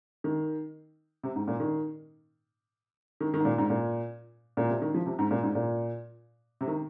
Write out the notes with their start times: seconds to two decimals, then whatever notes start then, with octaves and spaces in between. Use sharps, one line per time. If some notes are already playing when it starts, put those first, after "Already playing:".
0.24 D#3
1.23 C3
1.36 G#2
1.48 A#2
1.60 D#3
3.21 D#3
3.34 D#3
3.40 G#2
3.45 A#2
3.58 G#2
3.70 A#2
4.57 A#2
4.70 C3
4.82 D#3
4.94 F3
5.06 C3
5.19 G#2
5.31 A#2
5.43 G#2
5.55 A#2
6.61 C3
6.67 D#3